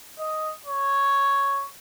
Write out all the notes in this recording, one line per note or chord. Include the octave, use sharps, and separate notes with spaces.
D#5
C#5